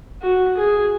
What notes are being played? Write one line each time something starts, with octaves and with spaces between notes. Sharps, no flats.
F#4
G#4